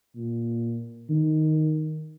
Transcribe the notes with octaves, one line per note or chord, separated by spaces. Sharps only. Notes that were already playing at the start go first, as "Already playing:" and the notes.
A#2
D#3